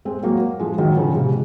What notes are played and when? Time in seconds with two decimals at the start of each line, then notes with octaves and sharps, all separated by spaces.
0.05 G#3 C4
0.23 F#3 A#3
0.60 F3 G#3
0.78 D#3 F#3
0.97 C#3 F3
1.15 G#2 C3